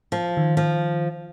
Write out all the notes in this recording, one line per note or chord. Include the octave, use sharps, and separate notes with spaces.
F3
D#3
F3